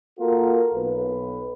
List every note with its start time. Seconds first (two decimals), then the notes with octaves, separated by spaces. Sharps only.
0.20 A#3 F4 F#4 A4 A#4
0.75 B1 B4